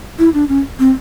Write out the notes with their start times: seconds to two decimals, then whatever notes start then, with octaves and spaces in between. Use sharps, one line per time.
0.19 E4
0.34 D4
0.49 C#4
0.80 C4